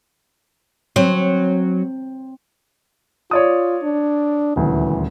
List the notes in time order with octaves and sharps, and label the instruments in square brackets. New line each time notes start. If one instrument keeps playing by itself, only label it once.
[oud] F#3 [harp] C4
[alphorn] F4 [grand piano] C#5 D5 D#6
[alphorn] D4
[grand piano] D#1 D2 [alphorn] E3